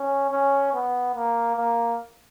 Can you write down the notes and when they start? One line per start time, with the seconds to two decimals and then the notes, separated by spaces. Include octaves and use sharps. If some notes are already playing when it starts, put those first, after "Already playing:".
Already playing: C#4
0.31 C#4
0.74 B3
1.15 A#3
1.57 A#3